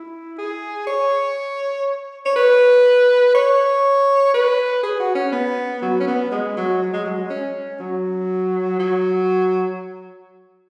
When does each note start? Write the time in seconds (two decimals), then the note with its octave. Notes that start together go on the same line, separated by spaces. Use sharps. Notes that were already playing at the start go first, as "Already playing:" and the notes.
Already playing: E4
0.38 G#4
0.87 C#5
2.26 C#5
2.36 B4
3.35 C#5
4.34 B4
4.83 G#4
5.00 F#4
5.15 C#4
5.32 B3
5.82 F#3
6.00 C#4
6.07 B3
6.31 G#3
6.57 F#3
6.82 F#3
6.93 G#3
7.06 F#3
7.17 G#3
7.30 C#4
7.80 F#3
8.79 F#3